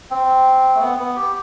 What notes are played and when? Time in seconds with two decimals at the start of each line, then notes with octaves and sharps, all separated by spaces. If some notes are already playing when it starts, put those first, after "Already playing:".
0.10 C4
0.75 A3
0.80 B3
0.98 B3
1.16 G4